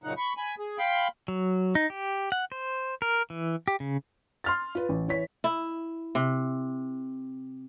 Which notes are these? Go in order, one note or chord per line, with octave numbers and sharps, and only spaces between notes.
F#2 A#2 C#3 D#4 F#5
B5 C#6
G#5 B5
G#4
F5 G5 B5 C6
F#3
D#4
G4
F#5
C5
A#4
E3
G4
C#3
C6 F6 A6
F4 B4
A1
E3 C#5 B6
E4
C3